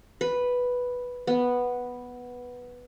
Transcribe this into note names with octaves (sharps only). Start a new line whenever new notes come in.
B4
B3